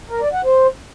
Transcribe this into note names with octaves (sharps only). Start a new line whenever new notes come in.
A#4
D5
F#5
C5